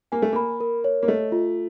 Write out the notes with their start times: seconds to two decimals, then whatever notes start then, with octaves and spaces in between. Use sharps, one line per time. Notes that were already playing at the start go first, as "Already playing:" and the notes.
0.12 A#3 G#5
0.22 A3
0.33 A#3 B5
0.61 A#4
0.85 C#5
1.03 A#3
1.08 A3 D#5
1.32 F4